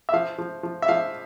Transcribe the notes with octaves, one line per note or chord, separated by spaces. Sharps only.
E5
F3 F5
F3
F3
E5
F3 F5